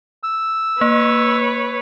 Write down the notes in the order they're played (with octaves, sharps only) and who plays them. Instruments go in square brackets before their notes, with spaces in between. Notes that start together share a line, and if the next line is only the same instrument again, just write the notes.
[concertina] E6
[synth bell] A#3 [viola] B4 C#5